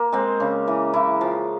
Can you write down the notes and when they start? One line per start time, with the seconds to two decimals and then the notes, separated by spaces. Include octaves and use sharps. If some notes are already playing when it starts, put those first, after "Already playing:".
Already playing: A#3
0.12 G#3 C4
0.40 C#3
0.67 E3
0.93 C#3 E4
1.21 F3